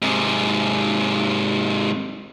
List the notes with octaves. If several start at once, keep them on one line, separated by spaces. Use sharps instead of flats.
G#2 C3